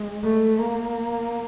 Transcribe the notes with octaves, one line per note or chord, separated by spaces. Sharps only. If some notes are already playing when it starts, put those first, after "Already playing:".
Already playing: G#3
A3
A#3